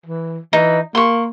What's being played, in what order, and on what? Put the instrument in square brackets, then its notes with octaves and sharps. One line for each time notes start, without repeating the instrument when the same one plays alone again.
[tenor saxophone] E3
[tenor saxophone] E3 [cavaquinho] D#4
[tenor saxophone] A#3 [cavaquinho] C6 C#6